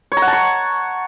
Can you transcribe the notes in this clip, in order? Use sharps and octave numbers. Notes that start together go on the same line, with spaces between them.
C#5
A#5
F#5
A5
C#6